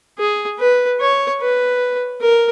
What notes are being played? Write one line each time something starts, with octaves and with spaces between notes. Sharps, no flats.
G#4
B4
C#5
B4
A#4